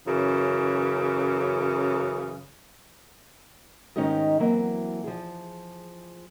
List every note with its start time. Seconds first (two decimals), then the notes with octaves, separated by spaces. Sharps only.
0.07 F#2 C#3 E3
3.96 G#2 D#3 C#4 D#4 G4 D#5
4.39 E3 F#3 A#3 C4
5.04 F3 G#4